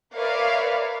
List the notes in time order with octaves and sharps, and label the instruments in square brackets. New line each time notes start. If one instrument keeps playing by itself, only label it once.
[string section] A#4 B4 C#5 D5 E5 F5